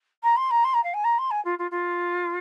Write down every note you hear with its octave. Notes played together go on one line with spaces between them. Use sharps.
A#5
C6
A#5
C6
A#5
F5
G#5
A#5
C6
G#5
F4
F4
F4